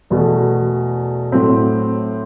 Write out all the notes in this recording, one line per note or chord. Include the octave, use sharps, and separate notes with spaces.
E2 B2 A3
A2 F#3 C4